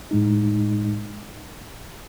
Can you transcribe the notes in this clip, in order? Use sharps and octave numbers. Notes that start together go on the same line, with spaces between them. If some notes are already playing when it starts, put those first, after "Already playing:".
A2 G#3 D#4